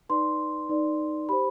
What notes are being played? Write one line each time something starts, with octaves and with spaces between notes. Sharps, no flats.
D#4 B4 D5 C6
D#4 B4 D5
G4 C5 B5